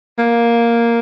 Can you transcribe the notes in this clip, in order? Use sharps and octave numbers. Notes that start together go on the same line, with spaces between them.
A#3